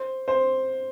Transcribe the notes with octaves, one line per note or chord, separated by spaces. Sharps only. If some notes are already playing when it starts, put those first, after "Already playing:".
Already playing: C5
C5